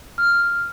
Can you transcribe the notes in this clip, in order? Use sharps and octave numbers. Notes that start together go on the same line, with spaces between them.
F6